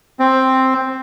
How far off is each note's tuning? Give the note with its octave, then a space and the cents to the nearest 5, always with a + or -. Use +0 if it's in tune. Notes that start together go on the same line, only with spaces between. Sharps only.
C4 +5